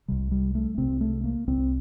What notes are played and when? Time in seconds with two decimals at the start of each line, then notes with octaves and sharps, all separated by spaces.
0.08 C2 C3 G3
0.31 G3
0.55 A3
0.78 C2 C3 C4
1.01 A3
1.24 A#3
1.47 C2 C3 C4